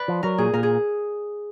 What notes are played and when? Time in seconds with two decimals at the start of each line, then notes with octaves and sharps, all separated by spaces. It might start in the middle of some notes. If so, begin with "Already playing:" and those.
Already playing: B4 D5
0.08 F3
0.23 F#3 A#4
0.38 A#2 G#4
0.53 A#2 A#4
0.63 G#4